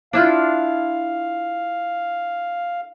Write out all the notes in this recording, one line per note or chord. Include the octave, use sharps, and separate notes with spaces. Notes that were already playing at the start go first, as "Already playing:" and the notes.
D4 E4 F4 F5